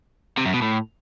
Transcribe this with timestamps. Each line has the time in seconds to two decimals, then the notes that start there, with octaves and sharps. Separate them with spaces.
0.37 C3
0.46 F#2
0.54 B2
0.62 A2